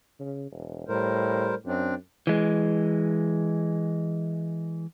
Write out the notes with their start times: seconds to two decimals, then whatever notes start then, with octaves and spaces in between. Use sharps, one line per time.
0.20 C#3
0.52 E1
0.88 A2 G3 A#4 C5
1.66 F#2 C4 D4
2.27 E3 G#3